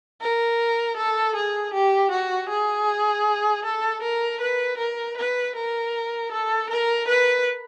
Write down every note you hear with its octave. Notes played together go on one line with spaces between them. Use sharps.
A#4
A4
G#4
G4
F#4
G#4
A4
A#4
B4
A#4
B4
A#4
A4
A#4
B4